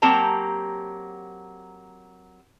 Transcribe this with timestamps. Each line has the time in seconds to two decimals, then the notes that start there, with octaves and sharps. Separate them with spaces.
0.02 F#3 A#3 C4 G4 A5 A#5